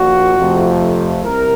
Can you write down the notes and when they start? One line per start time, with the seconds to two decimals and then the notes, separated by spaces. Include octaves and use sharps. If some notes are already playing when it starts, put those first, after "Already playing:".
Already playing: A#1 A#2 F3 F#4
0.36 F2 C3 F3 A3
1.24 C2 C3 A#4